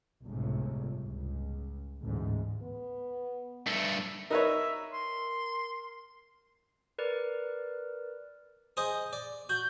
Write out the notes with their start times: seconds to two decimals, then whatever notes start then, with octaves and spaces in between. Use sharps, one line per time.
0.24 G1 C#2 A2 C3
1.03 C#2
2.02 A1 D2 G#2
2.62 B3
3.67 G2 A3
4.30 D#4 A#4 B4 C#5 E5
4.93 C6
6.98 A#4 B4 D5
8.77 G#4 C5 D#5
9.13 D5
9.49 F#4 G6